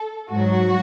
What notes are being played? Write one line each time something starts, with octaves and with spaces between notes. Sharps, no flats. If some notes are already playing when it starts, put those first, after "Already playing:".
Already playing: A4
G#2 F#3 F#4